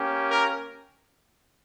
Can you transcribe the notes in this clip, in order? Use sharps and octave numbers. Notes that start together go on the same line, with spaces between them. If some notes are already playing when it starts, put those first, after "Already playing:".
Already playing: A#3 C#4 G4
A#4